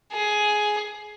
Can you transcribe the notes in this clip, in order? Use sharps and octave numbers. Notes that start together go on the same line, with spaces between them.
G#4